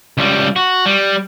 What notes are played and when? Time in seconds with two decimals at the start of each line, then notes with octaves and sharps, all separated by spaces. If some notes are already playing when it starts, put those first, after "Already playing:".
0.18 C#2 G3
0.56 F#4
0.86 G3